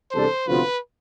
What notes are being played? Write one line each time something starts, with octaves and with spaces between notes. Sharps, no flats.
E2 C3 G3 D4 A4 C5
D2 C3 F3 B3 F4 B4